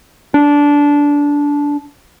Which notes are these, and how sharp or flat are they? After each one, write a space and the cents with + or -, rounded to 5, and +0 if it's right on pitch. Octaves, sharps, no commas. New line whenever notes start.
D4 -15